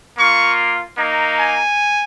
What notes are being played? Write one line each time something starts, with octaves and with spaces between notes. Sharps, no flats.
A#3 F4 C#6
A#3 D#4
G#5